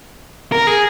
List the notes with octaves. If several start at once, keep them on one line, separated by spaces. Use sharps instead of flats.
A#4
G#4